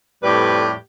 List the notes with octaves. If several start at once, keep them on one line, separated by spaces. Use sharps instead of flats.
F2 A2 G3 G4 B4 D5